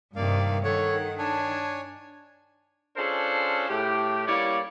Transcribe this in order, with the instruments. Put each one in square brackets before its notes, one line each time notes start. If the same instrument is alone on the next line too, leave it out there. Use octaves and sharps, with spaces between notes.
[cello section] G2 C3 D#3 [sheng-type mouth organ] A#3 D5 F5
[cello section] D#3 [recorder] A4 [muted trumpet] C#5 [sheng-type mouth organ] F#5
[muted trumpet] D4 [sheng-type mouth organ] C#5 G#5 [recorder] A5
[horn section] C#4 D4 F4 G#4 A4 C5
A2 G4
G3 A#3 C#4 E4 C#5 D5